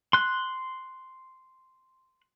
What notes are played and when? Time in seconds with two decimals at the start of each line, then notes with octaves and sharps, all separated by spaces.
0.13 C6 F#6